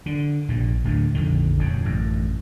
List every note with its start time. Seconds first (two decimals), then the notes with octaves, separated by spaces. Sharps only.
0.06 D3
0.48 A#1 G2 A#2
0.84 D1 D2 A2 D3
1.15 A#1 F2 D3 D#3
1.59 D#1 F2 C#3
1.85 A1 F#2